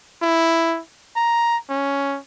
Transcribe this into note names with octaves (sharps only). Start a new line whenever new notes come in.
E4
A#5
C#4